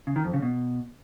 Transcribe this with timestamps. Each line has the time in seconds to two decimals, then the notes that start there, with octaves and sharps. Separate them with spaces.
0.07 C#3
0.16 D#3
0.25 F2
0.34 C#3
0.42 B2